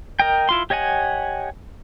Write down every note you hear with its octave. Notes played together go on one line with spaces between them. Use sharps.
A#4 D#5 G5
E4 F4 C6
G4 C#5 D#5 F#5 G#5